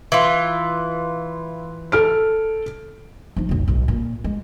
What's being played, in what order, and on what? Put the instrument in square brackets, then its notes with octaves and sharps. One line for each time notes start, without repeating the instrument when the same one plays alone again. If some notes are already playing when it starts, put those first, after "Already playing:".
[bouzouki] E3 F4
[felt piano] A4 F6 D7
[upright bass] F3 D#4
F1 B1
B1 A2
A#2
G#3